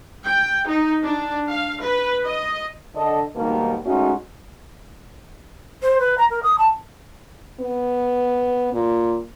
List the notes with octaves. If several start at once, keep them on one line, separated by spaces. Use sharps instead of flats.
G5
D#4
D4
F5
B4
D#5
D3 A4 D#5
G#2 B2 D#3 G3 A#3
G#3 A3 C#4 D#4 F#4
C5
B4
A#5
A#4
D#6
A5
B3
A#2